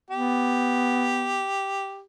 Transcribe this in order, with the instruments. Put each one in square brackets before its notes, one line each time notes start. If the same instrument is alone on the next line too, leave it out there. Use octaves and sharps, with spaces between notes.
[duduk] B3 [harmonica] G4